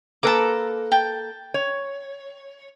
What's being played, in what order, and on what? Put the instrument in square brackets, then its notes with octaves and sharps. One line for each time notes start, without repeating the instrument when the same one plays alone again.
[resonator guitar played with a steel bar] A#3 A4 B4 [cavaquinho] A5 A#5 D6
[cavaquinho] G5 A5
[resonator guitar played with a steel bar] C#5